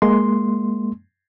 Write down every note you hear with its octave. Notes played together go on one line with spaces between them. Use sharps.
G#3 A#3 C6